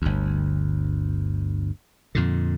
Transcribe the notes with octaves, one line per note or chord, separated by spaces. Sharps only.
G1 D2
F2 A#2 D3